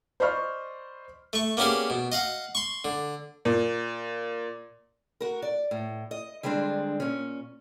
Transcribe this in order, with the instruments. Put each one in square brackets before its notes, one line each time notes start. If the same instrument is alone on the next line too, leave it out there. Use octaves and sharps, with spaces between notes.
[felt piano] C5 D5 D#5 B5 C#6 F6
[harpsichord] A3 C#6
A#3 B3 C#4 G4 G#4 D5
B2
D#5 F5 F#5
C6 C#6
D3
[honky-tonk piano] A#2
[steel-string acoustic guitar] F#4 A#4
D5
A2
D#5
D3 G3 G#3 C4 D4
A#2 C#4